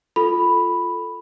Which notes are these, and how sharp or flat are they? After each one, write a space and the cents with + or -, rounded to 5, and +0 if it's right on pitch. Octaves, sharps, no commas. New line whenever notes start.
F4 +0 A4 +0 B5 +0